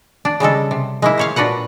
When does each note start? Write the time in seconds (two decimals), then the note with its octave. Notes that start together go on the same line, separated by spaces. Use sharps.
0.25 D4
0.40 C#3 G3 G#3 A4
0.71 C3
1.02 G#3 A#3 E4
1.18 C5 C#5 F5
1.36 A#2 D4 F#4 B4 F#5